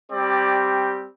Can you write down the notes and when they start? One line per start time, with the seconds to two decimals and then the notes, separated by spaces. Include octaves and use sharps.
0.11 G3 C4 G4 D5